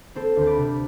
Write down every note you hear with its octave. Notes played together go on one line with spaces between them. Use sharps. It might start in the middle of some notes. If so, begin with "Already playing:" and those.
C4 A4 C5
D2 C5
B4 D5
C3